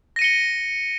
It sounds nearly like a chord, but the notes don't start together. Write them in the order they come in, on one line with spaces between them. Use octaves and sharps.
A#6 D#7 C#7 G7